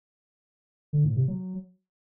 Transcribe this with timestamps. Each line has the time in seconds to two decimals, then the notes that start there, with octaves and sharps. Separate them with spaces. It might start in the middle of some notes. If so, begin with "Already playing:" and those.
0.93 D3
1.05 A2
1.16 C3
1.28 F#3